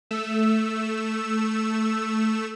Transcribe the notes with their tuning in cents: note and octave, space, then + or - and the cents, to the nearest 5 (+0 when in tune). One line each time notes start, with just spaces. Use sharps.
A3 +0 E6 +0